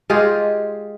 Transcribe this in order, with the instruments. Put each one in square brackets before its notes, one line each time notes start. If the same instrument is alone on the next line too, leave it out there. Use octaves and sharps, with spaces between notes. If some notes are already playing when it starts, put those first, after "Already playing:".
[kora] G#3 F4 G4 G#4